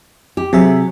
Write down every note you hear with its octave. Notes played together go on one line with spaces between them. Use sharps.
G4
C3 F#3 G#4 E5